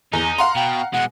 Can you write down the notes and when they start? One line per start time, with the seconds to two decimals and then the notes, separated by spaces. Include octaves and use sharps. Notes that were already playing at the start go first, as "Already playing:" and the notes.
0.13 E2 D#4
0.38 F5 F#5 A#5 C6
0.56 B2 G5
0.93 B2 G#3 F#5